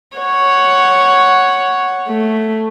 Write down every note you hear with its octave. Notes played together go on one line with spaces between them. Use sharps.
C#5 F#5
A3